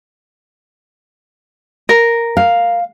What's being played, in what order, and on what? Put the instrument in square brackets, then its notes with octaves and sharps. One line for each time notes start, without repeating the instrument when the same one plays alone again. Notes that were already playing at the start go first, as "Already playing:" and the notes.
[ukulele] A#4
[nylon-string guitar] F5